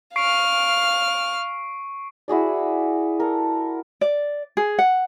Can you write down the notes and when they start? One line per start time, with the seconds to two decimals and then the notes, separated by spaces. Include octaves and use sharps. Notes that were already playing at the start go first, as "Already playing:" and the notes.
0.16 F5 C#6 F6 C7 D7
2.28 E4 F#4 G#4 D5
3.20 A4 A#4
4.01 D5
4.57 G#4
4.79 F#5